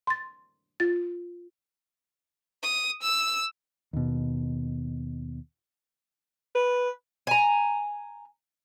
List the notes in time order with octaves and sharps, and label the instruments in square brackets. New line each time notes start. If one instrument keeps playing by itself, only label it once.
[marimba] C6 A6
F4 A6
[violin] D#6
E6
[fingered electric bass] D#2 B2
[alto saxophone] B4
[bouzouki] G#5 A#5